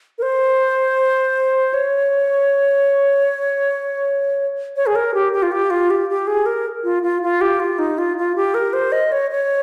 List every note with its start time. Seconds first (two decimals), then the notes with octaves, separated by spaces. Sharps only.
0.18 A#4
0.22 C5
1.74 C#5
4.76 C#5
4.86 G#4
4.96 A#4
5.14 G4
5.33 G4
5.43 F4
5.52 G4
5.70 F4
5.90 G4
6.09 G4
6.27 G#4
6.46 A#4
6.84 F4
7.03 F4
7.22 F4
7.41 G4
7.60 F4
7.79 D#4
7.98 F4
8.17 F4
8.36 G4
8.54 A#4
8.73 C5
8.92 D#5
9.12 C#5
9.30 C#5